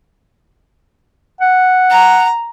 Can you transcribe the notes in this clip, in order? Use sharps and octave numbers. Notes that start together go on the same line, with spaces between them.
F#5
A#5